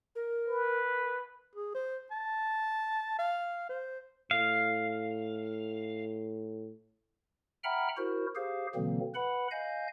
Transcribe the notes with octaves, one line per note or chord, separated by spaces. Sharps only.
A#4
B4
G#4
C5
A5
F5
C5
A2 F5
E5 F#5 G5 A#5 B5 F6
E4 F#4 A#4 C5
G4 G#4 C5 F5
B2 D3 E3 F#3 A#3 C4
B4 F#5 B5
D#5 F5 G#5 G6